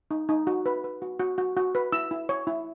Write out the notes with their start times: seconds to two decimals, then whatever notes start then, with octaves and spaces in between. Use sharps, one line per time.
0.11 D#4
0.29 D#4
0.47 F#4
0.66 B4
0.84 B4
1.02 F#4
1.19 F#4
1.38 F#4
1.57 F#4
1.75 B4
1.92 E4 E6
2.11 E4
2.29 C#5
2.47 E4